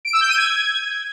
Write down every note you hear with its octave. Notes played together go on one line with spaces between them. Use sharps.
D7
E6
G6
D#7
G#6